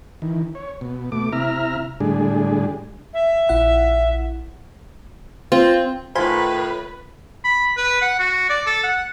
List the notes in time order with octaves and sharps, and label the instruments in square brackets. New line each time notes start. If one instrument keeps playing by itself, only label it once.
[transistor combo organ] D#3 E3
C#5
B2
B2 A3 D6
C3 E4 E5 A#5 F6
A2 D3 G3 G#3 D4 G#4
[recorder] E5
[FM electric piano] A#1 E4 F#5
[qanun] C4 [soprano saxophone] F4
[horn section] A2 D#3 [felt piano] F4 [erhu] B4 [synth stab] C5 G#5 B5
[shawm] B5
B4
F#5
F#4
D5
A4
F#5